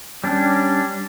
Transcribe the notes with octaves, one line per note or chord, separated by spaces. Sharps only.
G3 C#4 D4